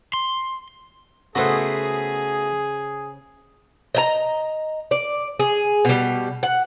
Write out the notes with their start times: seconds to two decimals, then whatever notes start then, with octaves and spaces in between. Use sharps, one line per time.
0.14 C6
1.35 C#3 A3 B3 F#4 G#4 C5 F#5
3.95 D#5 E5 A#5
4.91 D5
5.39 G#4
5.85 B2 G3
6.43 F#5